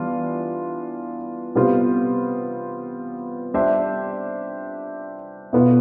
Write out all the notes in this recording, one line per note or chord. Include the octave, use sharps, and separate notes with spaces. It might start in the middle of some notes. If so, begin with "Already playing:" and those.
Already playing: E3 G3 B3 D4 F4
C3 G3 B3 F4 C5
G3 D4 G4 C5 E5
B2 B3 F4 B4